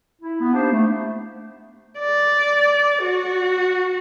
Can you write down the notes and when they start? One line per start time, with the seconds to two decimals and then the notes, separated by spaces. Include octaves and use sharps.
0.22 E4
0.41 B3
0.53 A#3 B3 D4 D#4 G4 C5
0.72 A3
1.99 D5
3.02 F#4